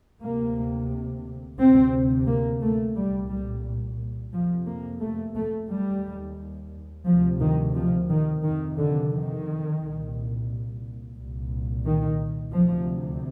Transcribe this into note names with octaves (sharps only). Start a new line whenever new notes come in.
D2 C3 A#3
D2 C3 C4
A#3
A3
C2 A#2 G3
G3
F2 C3 F3
A#3
A3
A3
D#2 G3
D2 C3 F3
D#3
F3
D#3
F2 C3 D#3
D3
D#3
C2 A#2
C2 A#2
D#3
D2 C3 F3